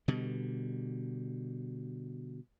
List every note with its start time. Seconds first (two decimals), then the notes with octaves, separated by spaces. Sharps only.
0.08 B2 D3 G3